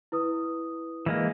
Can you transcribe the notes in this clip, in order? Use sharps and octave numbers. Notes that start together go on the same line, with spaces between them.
E4 B4 D#6
E3 G#3 A#3